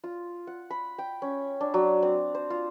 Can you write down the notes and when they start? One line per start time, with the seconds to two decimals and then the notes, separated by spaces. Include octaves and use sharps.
0.04 F4
0.47 F#5
0.70 B5
0.98 G5
1.22 C#4
1.61 D4
1.74 F#3
2.03 C4
2.35 C5
2.50 F4